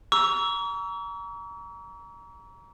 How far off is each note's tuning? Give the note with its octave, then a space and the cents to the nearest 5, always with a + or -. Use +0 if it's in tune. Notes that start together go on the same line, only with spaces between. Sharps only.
A#5 +15 C#6 +45 E6 +0